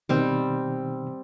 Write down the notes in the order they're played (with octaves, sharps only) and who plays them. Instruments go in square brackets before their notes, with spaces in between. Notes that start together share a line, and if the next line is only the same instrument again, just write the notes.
[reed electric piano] B2 D#3 [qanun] G3 C4